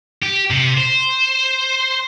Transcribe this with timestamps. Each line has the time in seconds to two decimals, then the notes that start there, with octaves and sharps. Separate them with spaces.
0.22 G4
0.50 C3
0.78 C5